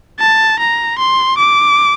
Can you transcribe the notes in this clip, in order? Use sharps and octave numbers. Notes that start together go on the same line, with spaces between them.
A5
A#5
C6
D6